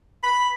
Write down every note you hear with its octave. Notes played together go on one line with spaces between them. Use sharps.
B5